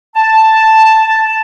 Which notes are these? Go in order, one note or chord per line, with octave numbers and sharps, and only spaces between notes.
A5